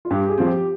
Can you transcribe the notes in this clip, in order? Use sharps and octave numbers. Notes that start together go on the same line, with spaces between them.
F4
G2 G4
G#4
F3 C4 F4
G4